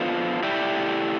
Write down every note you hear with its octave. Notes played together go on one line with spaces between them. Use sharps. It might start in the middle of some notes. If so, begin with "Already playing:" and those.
Already playing: F3 B3 D4 F4 A4
A3 E4 G4 D5